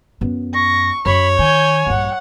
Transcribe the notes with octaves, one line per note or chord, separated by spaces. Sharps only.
F#2 B3
C#6 A#6
F#2 C#5 B5
D#3 G#5 G6
A#1 G2 F#5